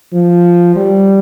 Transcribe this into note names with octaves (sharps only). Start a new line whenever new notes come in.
F3
G3